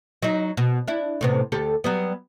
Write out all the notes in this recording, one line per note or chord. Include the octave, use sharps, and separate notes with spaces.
F#3 D#4
B2
D4 E4
A2 C3 B3
D2 G4 A4
F#3 G3 B3